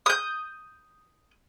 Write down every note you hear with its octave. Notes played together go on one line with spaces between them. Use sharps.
D#6 G6